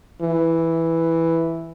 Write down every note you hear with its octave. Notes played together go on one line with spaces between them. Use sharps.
E3